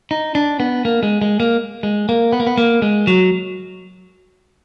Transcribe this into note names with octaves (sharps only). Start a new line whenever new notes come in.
D#4
D4
B3
A#3
G#3
G#3
A#3
G#3
A#3
B3
A#3
B3
A#3
G#3
F#3